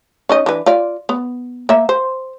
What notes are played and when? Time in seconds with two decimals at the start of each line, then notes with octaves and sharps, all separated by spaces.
0.29 C#4 D#4 D#5
0.46 E3 D4 B4
0.66 F4 D5
1.09 B3
1.69 A#3 E5
1.89 C5